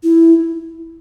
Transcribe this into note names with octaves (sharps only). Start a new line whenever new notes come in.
E4